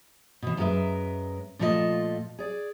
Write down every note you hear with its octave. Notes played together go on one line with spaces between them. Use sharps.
B2 E3
F#2 G#3 F4 A#4 B4 E5
A#2 F3 A3 F4 B4 D#5
G#4 D5